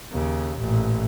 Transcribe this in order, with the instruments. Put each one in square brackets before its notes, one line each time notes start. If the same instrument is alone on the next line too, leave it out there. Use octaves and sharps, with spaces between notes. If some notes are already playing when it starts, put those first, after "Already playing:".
[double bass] D#2 C#3
A1 A#2